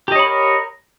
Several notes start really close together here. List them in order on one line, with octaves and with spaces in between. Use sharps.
G4 D#5 C#5 B5 A#4